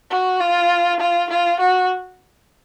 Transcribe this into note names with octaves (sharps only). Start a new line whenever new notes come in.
F#4
F4
F4
F4
F#4